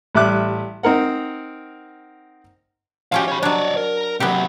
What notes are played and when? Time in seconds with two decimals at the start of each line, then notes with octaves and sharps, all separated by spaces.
0.15 A1 G3 E5 D6 F#6
0.83 C4 D#4 A#4 F#5
3.12 F3 C#4 F#4 G4 F5
3.28 C#5 B5
3.43 F#3 D4 C#5 D5
3.77 A#4
4.20 C3 F#3 B3 G4